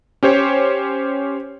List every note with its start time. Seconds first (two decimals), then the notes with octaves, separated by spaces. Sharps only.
0.23 C#4 G4 C5 C#5